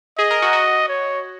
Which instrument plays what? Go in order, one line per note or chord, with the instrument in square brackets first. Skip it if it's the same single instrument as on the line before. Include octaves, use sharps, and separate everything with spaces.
[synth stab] G#4 [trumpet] D#5
[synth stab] A#4
F#4
F#4
[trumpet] C#5